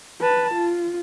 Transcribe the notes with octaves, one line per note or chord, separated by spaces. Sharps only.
B4 A5
F4